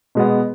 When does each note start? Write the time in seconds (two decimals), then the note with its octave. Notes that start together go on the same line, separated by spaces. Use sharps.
0.15 B2 G#3 B3